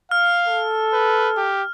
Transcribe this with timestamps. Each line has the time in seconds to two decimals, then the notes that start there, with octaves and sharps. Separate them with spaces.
0.11 F5 F6
0.48 A4
0.93 B4
1.37 G4